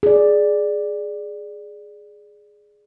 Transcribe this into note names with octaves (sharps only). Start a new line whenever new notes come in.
G#4 D5